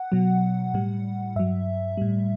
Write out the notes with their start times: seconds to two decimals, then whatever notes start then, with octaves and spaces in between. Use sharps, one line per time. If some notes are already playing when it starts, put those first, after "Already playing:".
Already playing: F#5
0.12 B2 F#3
0.74 A2 G3
1.36 G2 F#3 E5
1.97 A2 G3